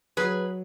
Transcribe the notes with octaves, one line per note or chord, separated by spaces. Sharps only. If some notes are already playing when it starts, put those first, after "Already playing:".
F#3 G#4 B4